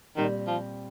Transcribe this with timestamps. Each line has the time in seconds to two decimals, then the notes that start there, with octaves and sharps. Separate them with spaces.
0.17 A#2 D#3 G3 C4
0.47 F3